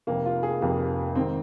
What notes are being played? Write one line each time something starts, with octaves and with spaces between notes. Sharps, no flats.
F1 F2 C3 A#3
F4
G#4
F1 F2 C3 A#3
G#1 D#3 C4